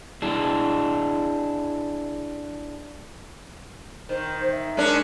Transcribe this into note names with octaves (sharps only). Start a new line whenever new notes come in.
D4 E4 G#4
D#3 C5
E5
G#3 C#4 D4 A#4